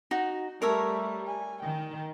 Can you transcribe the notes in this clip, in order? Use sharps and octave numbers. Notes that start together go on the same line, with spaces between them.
D#4 F#4
G3 A3 A#4 C#5 E5
G#5
D#3 G5